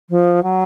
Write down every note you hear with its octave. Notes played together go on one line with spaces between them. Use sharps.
F3
F#3